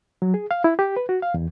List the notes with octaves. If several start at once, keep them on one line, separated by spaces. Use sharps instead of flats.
F#3
G#4
F5
E4
G4
B4
F#4
F5
E2